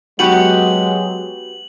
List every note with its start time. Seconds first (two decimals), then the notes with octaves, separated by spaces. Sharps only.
0.19 F#3 G#3 B3 F#4 G4 F#7